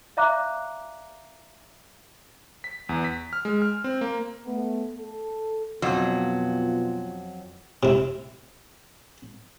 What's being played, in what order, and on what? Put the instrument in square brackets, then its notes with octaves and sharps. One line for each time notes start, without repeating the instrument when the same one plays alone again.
[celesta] D5 E5 F5 A#5 D6 F#6
[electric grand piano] B6
E2
B6
F6
G#3
F6
C4
A#3
[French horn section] A3 B3
A4
[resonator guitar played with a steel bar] F2 F#3 [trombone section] B2 F4
[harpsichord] C3 E4